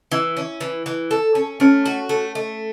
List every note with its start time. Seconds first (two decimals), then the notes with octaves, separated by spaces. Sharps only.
0.11 E3 E4
0.37 C#4
0.61 E3
0.86 E3
1.11 A4
1.35 C#4
1.60 A3 C#4
1.86 F#4
2.09 A3
2.35 A3